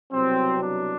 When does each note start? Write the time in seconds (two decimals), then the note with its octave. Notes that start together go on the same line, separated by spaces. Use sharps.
0.13 C2 B2 F#3 C4
0.62 D4